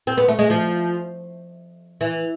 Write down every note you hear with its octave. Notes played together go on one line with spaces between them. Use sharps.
C4
B3
A3
G#3
F3
E3